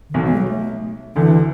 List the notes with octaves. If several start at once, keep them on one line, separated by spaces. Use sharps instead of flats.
D3
B1 B2 E3
E3
G#3
F#3
A3
D2 D3 E3